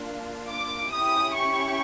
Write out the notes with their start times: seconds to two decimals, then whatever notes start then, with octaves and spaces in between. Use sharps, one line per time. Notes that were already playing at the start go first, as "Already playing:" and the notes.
Already playing: A#3 D4 F4
0.48 D6
0.91 C#4 E4 G4 D#6
1.34 C#6